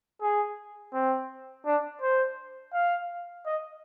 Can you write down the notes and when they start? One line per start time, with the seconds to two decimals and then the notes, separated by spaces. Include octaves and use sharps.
0.22 G#4
0.94 C4
1.66 D4
2.02 C5
2.73 F5
3.46 D#5